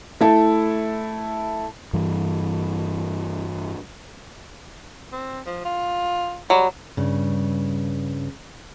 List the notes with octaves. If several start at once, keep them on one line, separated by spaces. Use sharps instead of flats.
A3 E4 A4
G2 E3
C4
F3
F4
F#3 G3
G2 C#3